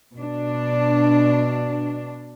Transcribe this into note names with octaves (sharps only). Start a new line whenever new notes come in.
B2 D4